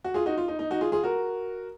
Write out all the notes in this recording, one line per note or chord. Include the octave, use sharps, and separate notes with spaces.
F#4
F4 G#4
D#4 F#4
F4
D#4
D#4
D#4 F#4
F4 G#4
F4 G#4
F#4 A#4